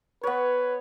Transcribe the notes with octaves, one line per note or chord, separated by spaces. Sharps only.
B3 B4 C#5